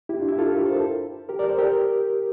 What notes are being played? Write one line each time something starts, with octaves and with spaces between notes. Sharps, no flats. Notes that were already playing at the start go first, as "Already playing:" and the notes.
E4 G4
D4 F4
E4 G4
F4 A4
G4 A#4
A4 C5
G4 A#4
A#4 D5
A4 C5
G4 A#4